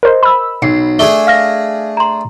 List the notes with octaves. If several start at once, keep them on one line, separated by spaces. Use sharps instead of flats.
A#4 C5 D#5
B5 E6
B1 C7
A3 D4 G#4 G7
F5 F6 A#6
A#5 C6